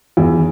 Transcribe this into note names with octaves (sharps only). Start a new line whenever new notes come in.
E2